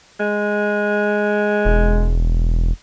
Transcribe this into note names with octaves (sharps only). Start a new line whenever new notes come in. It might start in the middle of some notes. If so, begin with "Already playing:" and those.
G#3
E1